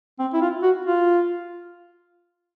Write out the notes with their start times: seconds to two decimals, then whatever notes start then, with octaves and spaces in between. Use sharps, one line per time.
0.19 C4
0.34 E4
0.41 F4
0.63 F#4
0.86 F4